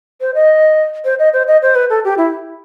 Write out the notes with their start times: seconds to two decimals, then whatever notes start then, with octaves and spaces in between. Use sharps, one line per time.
0.21 C5
0.35 D#5
1.05 C5
1.19 D#5
1.33 C5
1.47 D#5
1.62 C5
1.75 B4
1.90 A4
2.04 G4
2.18 E4